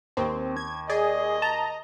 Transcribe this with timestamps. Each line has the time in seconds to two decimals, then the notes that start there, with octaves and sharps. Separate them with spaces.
0.17 D#2 C4
0.57 G#6
0.90 G#4 D5 D#5
1.42 A5 A#5